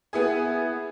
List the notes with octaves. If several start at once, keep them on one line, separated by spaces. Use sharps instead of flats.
B3 E4 G#4